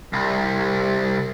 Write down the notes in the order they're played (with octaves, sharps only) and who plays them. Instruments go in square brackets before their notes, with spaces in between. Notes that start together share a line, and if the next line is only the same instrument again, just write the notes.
[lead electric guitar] C2